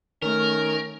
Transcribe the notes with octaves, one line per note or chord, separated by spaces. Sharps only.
D#3 A3 C#4 A#4